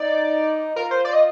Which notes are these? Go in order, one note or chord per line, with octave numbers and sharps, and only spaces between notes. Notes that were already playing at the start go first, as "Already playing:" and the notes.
Already playing: D#4 D5
F4 A#4
C5
D5
D#5